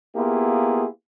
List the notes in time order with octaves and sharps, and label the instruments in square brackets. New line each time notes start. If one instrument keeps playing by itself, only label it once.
[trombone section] A#3 B3 E4 F4 G4 G#4